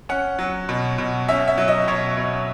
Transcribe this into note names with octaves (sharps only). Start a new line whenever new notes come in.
C#4 F#5
F#3
B2
B2
C#4 E5
E5
F#3
D#5
B2 C#5
B2